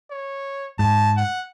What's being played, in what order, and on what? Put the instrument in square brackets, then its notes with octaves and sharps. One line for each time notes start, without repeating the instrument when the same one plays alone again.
[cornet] C#5
[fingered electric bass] G#2 [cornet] A5
[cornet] F#5